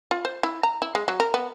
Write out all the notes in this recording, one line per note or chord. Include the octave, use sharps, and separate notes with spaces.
F4
C5
E4
A#5
E4
G#3
F#3
A#4
B3